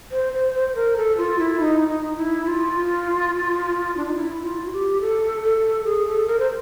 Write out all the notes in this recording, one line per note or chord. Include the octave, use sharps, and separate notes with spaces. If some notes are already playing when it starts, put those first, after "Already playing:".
C5
C5
C5
A#4
A4
F4
E4
D#4
D#4
E4
F4
D4
D#4
E4
F4
F#4
G4
A4
A4
G#4
A4
A#4
C5